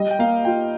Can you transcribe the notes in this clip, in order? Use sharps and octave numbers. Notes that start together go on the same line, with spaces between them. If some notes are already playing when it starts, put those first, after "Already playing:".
Already playing: G3 D#5
G5
A#3 F5
F4 G5